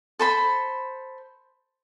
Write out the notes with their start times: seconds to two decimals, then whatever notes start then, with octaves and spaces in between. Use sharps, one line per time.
0.19 A4 C5 B5